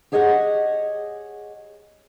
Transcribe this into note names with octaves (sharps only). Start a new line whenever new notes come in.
G4 G#4 C#5 D#5 F5 F#5